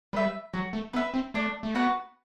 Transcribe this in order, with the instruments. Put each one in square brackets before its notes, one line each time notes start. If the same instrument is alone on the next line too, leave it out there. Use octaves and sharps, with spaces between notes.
[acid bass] G3 [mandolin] B4 E5
[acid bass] F#3 [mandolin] F#4
[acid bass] A3
[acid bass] B3 [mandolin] B4 E5
[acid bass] C4
[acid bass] A3 [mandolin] D4
[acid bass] A3
[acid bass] B3 [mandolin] F#4 B4 F#5